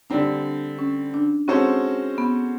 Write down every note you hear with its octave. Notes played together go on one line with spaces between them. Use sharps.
D3 G3 C4 D4
C#4
D4
G#3 C4 C#4 F#4 A4 C5
B3